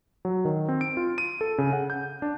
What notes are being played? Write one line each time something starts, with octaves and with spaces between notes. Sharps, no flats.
F#3
D#3
C4
D7
F4
D#7
A4
C#3
F#5
G6
D4